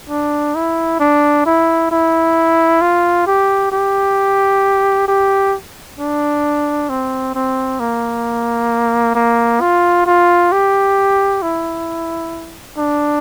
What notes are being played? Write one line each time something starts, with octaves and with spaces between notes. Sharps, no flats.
D4
E4
D4
E4
E4
F4
G4
G4
G4
D4
C4
C4
A#3
A#3
F4
F4
G4
E4
D4